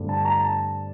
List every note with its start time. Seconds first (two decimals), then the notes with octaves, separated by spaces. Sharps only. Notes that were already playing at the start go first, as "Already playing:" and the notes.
Already playing: G2 D3 A3 C4
0.09 A5
0.25 A#5
0.41 A5